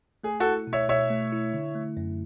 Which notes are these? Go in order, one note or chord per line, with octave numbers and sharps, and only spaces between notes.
A3 G#4
F#4 A4
E4
B2
C#5 E5
B2 C#5 E5
A3
E4
D3
A3
F#2